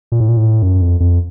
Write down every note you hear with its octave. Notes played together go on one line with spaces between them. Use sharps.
A#2
A2
A#2
A2
F#2
F2
F2